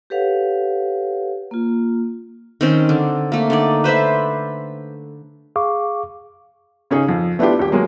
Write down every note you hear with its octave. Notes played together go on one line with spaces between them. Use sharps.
G4 A4 B4 C#5 F5 F#5
A#3 F4
D#3 C4 C#4
D3
A3 A#3
D3 D#4 D5
B4 C5 D5 E5
G#4 F5 C#6 D6
C#3 C#4 D#4 G#4
F2
A3 B3 D4 E4 F4 G4
D#1 G4
F#3 G#3 A#3